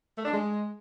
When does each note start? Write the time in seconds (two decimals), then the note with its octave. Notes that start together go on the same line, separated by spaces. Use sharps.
0.17 A3
0.25 D4
0.33 G#3